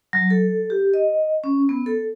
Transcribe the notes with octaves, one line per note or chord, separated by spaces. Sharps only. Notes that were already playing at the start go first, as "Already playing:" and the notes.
F#3
A4
G4
D#5
C#4
B3
A4